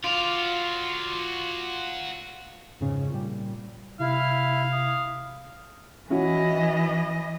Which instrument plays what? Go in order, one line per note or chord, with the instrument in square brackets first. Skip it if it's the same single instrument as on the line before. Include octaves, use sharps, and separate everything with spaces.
[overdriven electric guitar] F4 [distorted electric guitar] F#4 D5
[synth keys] F2 G#2 C#3 C#4
A#2 G3
[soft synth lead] C3 [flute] E4 [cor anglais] F5
[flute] D#6
[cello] E3 D#5 [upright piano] C#4 E4 F#4